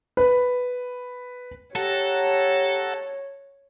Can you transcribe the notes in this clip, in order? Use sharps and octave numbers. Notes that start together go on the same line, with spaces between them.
B4
G4 A4 C#5 F#5 A5 A#5